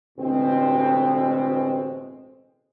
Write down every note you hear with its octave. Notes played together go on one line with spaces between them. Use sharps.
A1 D2 B2 G#3 C4